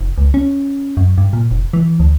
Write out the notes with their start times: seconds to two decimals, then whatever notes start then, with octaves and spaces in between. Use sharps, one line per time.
0.01 F1
0.18 C#2
0.34 C#4
0.97 F#2
1.18 G2
1.33 A#2
1.51 F1
1.73 E3
2.00 D2